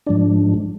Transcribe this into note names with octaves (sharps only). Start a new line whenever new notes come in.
G#2 F3 G#3 D4 D5